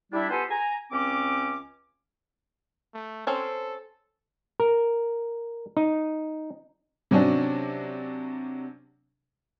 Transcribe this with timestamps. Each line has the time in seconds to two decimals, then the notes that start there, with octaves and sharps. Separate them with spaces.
0.13 G3 D4 E4
0.30 B3 F4 G4 A4 C5 G#5
0.51 G#5 A#5
0.92 C#2 C4 C#4 D6
2.94 A3
3.27 C4 C#4 A4 C5
4.60 A#4
5.77 D#4
7.11 C3 F#3 C#4 D4